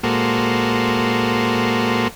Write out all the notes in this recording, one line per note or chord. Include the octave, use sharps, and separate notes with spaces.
A#2 G#3 A#3 F#4 A4 C5